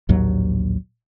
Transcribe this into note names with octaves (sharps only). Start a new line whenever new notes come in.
A#1 D#2 A2 F#3